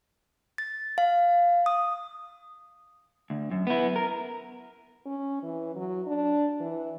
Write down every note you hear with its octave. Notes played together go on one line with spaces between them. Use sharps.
A6
F5
D#6
D2
F#2
B3 E4
A#4
C#4
E3
F#3
D4
E3